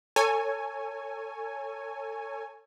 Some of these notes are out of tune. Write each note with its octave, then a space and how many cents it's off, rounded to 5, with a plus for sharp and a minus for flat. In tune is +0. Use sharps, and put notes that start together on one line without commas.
A4 +30 C#5 +0 G#5 +0